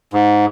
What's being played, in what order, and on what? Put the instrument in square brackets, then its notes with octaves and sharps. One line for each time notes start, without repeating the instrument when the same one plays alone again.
[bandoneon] G#2